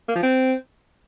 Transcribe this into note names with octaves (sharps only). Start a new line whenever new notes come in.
A#3
F3
C4